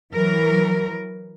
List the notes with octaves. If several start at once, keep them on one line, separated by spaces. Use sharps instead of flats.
E3 F#3 A#4